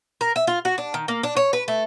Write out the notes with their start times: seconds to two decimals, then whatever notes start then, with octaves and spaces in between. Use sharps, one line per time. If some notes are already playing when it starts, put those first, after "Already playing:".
0.21 A#4
0.36 E5
0.47 F4
0.65 F#4
0.78 D4
0.94 D#3
1.08 A#3
1.23 D4
1.36 C#5
1.53 B4
1.68 A3